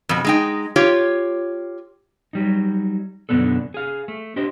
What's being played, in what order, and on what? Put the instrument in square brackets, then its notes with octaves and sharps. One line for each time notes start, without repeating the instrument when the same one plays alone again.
[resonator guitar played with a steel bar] F2 B2
G#3 D#4 G5
F4 G4 C#5
[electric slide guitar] F#3 G3 D#4
F#2 B2 D3 B3 D4 A4
G#4 F5
A3
D4 G4 C5 D#5